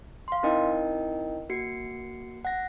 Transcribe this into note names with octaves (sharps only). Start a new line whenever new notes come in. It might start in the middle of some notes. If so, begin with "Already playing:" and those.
F5 C6
C4 D#4 E4 A#4 D#5 G5
A#3 F#4 C7 C#7
F#5 A#6